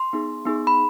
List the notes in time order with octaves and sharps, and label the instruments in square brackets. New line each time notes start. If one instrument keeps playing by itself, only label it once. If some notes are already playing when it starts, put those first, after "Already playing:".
Already playing: [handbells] C6
B3 D#4 G#4
B3 D#4 G#4
B5